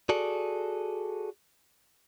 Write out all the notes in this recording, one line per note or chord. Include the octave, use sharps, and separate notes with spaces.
F#4 G#4 A4 D5